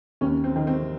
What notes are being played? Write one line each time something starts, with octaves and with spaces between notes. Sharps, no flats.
D#2 C#4
C4
D#3
C4